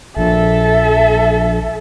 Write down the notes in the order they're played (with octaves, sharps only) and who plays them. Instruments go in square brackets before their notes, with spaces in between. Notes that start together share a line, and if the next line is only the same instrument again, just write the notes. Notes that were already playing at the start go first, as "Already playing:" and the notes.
[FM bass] A#1 [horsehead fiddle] A4 E5